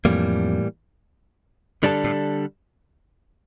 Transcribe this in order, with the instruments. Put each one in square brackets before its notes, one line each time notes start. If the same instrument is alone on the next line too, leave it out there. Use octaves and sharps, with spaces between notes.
[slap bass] F2 [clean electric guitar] A2 E3 G3 A#3
[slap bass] G2 [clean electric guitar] D3 G3 D4 A4
[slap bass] A2